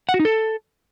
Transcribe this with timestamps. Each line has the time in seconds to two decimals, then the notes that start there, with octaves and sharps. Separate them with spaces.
0.09 F#5
0.14 F#4
0.20 D#4
0.25 A4